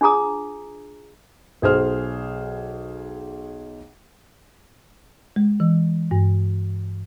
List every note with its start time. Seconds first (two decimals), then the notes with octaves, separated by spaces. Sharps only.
0.01 D4 F4 G#4 A#5 D#6
1.62 B1 G#4 C5 F6
5.36 G#3
5.60 E3
6.11 G2